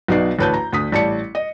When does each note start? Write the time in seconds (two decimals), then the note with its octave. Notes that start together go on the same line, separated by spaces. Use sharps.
0.08 B1 B2 B3 D#4 D5 C7
0.39 A1 D2 B4 C#5 A5 G6
0.54 A#5
0.73 D2 D#6 B6
0.92 A1 G3 A5 C#7
1.35 D#5